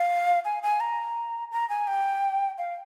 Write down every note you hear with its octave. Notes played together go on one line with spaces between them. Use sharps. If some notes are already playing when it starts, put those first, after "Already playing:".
Already playing: F5
G#5
G#5
A#5
A#5
G#5
G5
F5